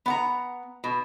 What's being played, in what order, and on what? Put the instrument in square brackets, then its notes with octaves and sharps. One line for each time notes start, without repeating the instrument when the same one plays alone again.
[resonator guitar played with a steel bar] B3 F#5 A#5
B2